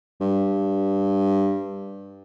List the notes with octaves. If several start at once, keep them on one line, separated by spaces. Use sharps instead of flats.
G2